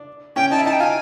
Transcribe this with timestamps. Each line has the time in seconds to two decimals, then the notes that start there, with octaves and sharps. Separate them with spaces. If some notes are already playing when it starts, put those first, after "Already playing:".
Already playing: D4
0.36 C#4 G5
0.51 D#4 A5
0.58 E4
0.65 D#4 A5
0.73 G5
0.80 F4 G#5